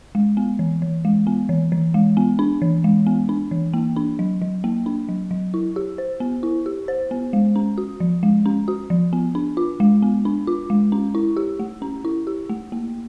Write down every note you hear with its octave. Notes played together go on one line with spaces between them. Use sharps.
G#3
B3
E3
E3
G#3
B3
E3
E3
G#3
B3
D4
E3
G#3
B3
D4
E3
A#3
D4
F#3
F#3
A#3
D4
F#3
F#3
E4
G4
C5
B3
E4
G4
C5
B3
G#3
C#4
F#4
F3
G#3
C#4
F#4
F3
B3
D4
F4
G#3
B3
D4
F4
G#3
C#4
E4
G4
A3
C#4
E4
G4
A3
A#3